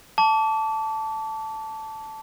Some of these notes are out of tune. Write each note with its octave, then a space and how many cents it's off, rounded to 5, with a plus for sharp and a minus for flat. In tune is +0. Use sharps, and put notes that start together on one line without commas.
A5 +0 D6 -35